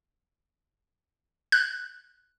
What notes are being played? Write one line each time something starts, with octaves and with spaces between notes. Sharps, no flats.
F#6